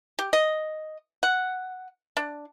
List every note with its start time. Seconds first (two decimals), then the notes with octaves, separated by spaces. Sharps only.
0.19 G4
0.33 D#5
1.23 F#5
2.17 D4